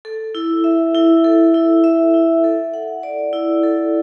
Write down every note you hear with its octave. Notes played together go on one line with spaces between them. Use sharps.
A4
E4
E5
E4
A4
E4
E5
E4
A4
F#5
D5
E4
A4